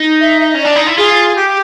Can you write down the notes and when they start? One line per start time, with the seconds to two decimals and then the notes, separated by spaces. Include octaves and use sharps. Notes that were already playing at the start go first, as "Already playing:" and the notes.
Already playing: D#4
0.21 E5
0.40 E5
0.44 D#5
0.55 C#4 D#5
0.63 D4 D5
0.76 D#4
0.87 E4
0.98 F4 G#4
1.36 G4